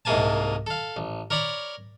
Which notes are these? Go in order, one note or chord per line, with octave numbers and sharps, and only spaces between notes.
C2 G#2 C3 A#3 G#5 A5
A4 F5
A1
A#4 C#5 D5 A#5 B5